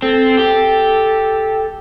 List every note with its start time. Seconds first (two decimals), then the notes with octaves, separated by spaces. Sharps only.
0.02 C4 A4
0.39 G4